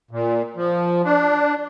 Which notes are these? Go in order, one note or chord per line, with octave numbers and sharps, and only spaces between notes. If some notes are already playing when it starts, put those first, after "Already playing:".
A#2
F3
D4